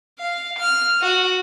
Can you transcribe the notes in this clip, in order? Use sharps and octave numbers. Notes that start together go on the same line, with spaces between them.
F5
F6
F#4